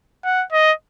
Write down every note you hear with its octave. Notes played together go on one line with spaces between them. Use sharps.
F#5
D#5